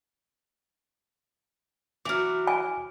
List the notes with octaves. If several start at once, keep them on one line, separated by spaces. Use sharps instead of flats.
E3 F#3 D6 F6
G#5